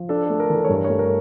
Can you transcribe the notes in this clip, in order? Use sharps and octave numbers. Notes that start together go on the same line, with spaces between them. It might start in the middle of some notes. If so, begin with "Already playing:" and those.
Already playing: F3
D4 A4
A3 A4
A#4
E3 A4
C#5
G2 A#4
A3 C#5
A#4